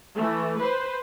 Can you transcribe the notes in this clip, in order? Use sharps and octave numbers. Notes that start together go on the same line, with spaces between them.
E3 A3
B4 C5